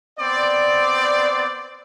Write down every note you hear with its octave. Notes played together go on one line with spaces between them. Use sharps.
B3 C4 D5